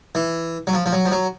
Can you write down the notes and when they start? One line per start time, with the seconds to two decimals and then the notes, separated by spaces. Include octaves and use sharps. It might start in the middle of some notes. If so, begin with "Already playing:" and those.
0.15 E3
0.67 F#3
0.73 F3
0.86 F3
0.93 F#3
1.06 F3
1.12 F#3